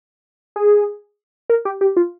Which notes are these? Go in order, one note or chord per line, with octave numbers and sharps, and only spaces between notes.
G#4
A#4
G4
G4
F4